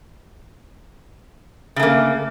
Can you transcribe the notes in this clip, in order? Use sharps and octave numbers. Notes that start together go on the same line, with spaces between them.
C#3 A3 A#3